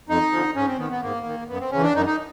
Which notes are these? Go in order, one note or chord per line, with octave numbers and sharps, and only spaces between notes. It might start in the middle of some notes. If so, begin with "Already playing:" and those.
F2 D#4
D3 F3
G#2 C#4
C4
D#3 B3
B3
G#2 A#3
D#3
F#2 B3
C4
C#3 E3 C#4
D4
F#2 D#4
D#4